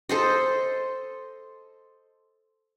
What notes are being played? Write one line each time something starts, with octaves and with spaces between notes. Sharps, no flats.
A4 C5 D#5